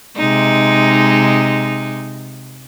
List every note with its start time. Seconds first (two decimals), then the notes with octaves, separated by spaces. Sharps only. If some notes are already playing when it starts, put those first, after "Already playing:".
0.16 C3 G#3 D#4